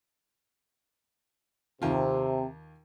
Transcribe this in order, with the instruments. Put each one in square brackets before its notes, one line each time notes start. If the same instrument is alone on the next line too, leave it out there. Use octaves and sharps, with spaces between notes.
[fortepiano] D#2 F4 [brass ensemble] C3